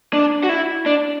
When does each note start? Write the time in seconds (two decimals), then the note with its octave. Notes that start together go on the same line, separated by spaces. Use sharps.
0.13 D4
0.43 F#4
0.49 E4
0.86 D4